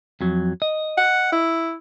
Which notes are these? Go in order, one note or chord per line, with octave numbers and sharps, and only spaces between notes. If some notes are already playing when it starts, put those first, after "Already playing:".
F2 F#3
D#5
F#5
E4